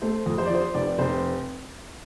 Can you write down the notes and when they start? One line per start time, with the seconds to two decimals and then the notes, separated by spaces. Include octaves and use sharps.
0.02 A3 C5
0.26 F2
0.38 C5
0.46 D5
0.50 F3 C5
0.74 F1 D5
0.99 F1 C5